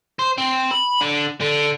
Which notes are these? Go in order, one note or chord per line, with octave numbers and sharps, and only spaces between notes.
C5
C4
B5
D3
D3